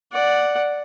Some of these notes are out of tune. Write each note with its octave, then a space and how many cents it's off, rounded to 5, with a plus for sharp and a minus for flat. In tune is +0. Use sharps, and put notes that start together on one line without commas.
D5 +0 F#5 +0